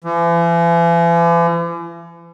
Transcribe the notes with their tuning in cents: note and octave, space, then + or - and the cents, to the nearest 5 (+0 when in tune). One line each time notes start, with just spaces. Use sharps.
E3 +45